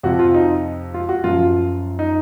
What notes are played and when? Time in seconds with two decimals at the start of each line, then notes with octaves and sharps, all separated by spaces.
0.03 F2 C3 F3 F#4
0.19 F4
0.34 D#4
0.94 F4
1.09 F#4
1.24 F#2 F3 F4
1.99 D#4